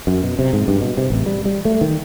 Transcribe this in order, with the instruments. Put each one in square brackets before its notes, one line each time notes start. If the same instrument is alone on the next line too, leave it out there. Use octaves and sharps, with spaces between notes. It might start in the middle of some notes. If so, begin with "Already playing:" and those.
[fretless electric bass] F#2
B2
C3
G#2
G2
B2
C3
A1
G3
G3
A3
D#3